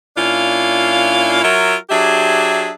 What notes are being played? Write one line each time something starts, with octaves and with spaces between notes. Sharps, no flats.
A#2 C#4 D4 E4 F4 F5
F#3 F4 F#4 A#4 E5
F#3 D4 G4 G#4 E5